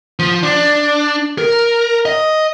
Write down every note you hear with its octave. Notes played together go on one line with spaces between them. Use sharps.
F3
D4
A#4
D#5